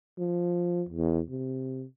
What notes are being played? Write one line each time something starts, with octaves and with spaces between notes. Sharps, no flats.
F3
E2
C3